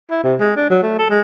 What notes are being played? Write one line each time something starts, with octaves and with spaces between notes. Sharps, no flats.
E4
C3
G#3
D4
F#3
A3
A4
G#3